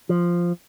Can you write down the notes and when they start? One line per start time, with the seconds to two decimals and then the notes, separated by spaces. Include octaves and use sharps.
0.09 F3